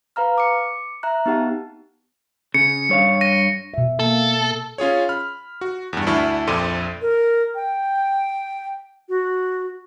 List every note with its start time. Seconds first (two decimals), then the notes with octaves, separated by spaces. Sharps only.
0.16 B4 F5 A#5 F6
0.38 D6 C#7
1.03 E5 A#5 F#6
1.26 B3 D#4 G4 F#5 A5
2.54 C#3 C#7
2.89 G2 C#5 F5
3.21 A#6 D#7
3.74 B2 E5
4.00 A#3 A4
4.78 C#4 F4 G#4 C#5
5.09 B5 F6
5.61 F#4
5.93 E2 G2
6.07 D2 D4 E4 A5 C#6 F6
6.47 A#1 F2 A4 C6 D6 D#7
7.02 A#4
7.55 G5
9.09 F#4